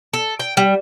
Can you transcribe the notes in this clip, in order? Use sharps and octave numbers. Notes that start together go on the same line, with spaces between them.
A4
G5
G3